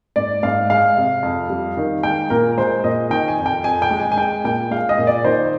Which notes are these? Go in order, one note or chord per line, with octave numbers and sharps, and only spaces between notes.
G#2 D5
G#2 F5
G#3 F5
C3
F2
G3
D#3
G#3 G5
A#2 A#4
G#3 C5
A#2 D#5
D#3 G5
G#5
F2
G5
F2 G#5
G5
G#3
G#5
G#5
G#3 G5
A#2 G5
G#3 F5
D#5
A#2
D5
D#3 C5